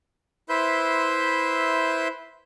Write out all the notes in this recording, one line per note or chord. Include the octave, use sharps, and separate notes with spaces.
E4 B4 C5 E5 C6 G6